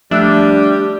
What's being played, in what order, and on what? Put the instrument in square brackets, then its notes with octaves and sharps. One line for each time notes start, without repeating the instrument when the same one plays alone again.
[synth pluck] F3 A3 [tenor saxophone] G3 [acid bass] D4 [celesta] E5 E6 F#6